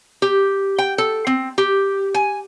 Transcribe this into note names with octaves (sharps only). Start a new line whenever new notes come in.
G4
G5
A4
C4
G4
G#5